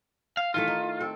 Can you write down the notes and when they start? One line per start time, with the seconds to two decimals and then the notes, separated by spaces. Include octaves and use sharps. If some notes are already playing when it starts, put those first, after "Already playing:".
0.37 F5
0.54 D#3 E3 A3 F4
0.68 D#4
1.00 C4 A4